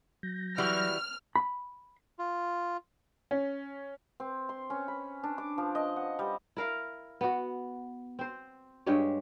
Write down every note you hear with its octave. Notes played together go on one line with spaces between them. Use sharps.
F#3 G6 A#6
E3 G3 F#4 F6
B5
F4
C#4
C4
C6
C#4
B5
D4
D6
F3
D#5
F#5
G3
E4 A#4 F5
B3 F#4
C4 C5
G2 G#3 G4 C#5